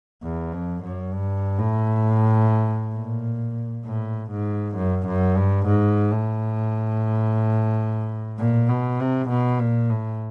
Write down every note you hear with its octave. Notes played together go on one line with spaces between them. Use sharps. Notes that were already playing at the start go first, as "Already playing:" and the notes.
E2
F2
F#2
G2
A2
A#2
A2
G#2
F#2
F#2
G2
G#2
A2
A#2
B2
C3
B2
A#2
A2